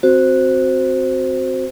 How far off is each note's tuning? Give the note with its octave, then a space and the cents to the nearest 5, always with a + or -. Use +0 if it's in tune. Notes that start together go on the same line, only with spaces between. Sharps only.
C4 +0 F#4 +0 C5 +0